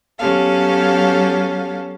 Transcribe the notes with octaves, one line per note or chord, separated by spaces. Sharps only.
F#3 B3 C#4 G4 A4 F5